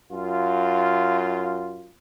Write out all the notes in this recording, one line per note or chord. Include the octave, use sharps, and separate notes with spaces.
F#2 F4